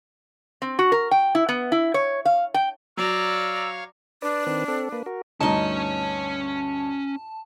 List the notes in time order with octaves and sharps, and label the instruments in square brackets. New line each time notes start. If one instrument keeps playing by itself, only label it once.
[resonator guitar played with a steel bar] C4
F#4
A#4
G5
E4
B3
E4
C#5
F5
G5
[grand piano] F#3 [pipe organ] C#5 F5 C#6 [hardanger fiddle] D5 A#5 [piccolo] E6
[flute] D4 [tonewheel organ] B4 D5
[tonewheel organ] D#3 C4 B4
C4 A4
A#3 B4
F#4 A#4
[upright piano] D2 G2 [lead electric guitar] C#4 C#5 [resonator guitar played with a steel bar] D#4 D#5 [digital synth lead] A5